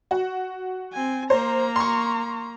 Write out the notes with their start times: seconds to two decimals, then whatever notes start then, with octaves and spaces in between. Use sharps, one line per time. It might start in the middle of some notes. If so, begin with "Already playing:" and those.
0.11 F#4
0.93 C4 G#5
1.30 A#3 C5 A#5
1.76 C6 C#6